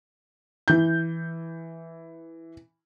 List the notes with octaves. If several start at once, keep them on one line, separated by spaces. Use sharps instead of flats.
E3 G6